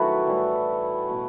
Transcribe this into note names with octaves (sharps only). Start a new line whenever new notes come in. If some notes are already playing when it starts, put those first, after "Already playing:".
Already playing: D#3 F#3 A3 E4 F#4 A4 B4
A2 E3 G3
B2 A3